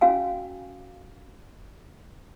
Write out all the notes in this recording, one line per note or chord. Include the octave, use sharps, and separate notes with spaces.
C#4 F#4 F5 G#5